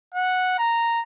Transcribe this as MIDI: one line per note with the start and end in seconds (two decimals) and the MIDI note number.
0.14 0.58 78
0.59 1.02 82